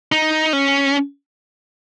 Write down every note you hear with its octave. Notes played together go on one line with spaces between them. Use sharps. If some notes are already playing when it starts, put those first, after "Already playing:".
D#4
C#4